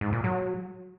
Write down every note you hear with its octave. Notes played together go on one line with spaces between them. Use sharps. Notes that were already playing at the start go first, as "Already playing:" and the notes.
G#2
A#2
F#3